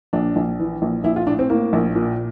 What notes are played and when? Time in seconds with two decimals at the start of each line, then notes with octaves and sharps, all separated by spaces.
0.13 A#1 D4
0.36 A#1
0.59 E3
0.82 A#1
1.04 A#1 E4
1.16 F4
1.26 A2 D4
1.39 C4
1.50 A2 A#3
1.73 A#1
1.95 A#2